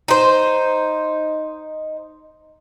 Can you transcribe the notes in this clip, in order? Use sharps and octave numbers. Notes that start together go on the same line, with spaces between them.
D#4 C5